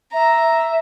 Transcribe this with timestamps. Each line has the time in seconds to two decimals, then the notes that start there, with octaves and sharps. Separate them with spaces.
0.13 E5 A#5